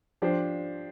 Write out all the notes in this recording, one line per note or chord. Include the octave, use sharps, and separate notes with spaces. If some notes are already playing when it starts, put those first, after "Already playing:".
F3 D4 G4 C5